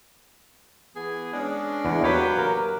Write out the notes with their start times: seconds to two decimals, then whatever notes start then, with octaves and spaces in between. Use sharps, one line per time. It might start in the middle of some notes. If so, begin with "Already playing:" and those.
0.96 E3 B3 G#4
1.33 G#3 C#4 D4
1.85 E2
2.04 F#3 A#3 G4 B4 C#5
2.39 A#4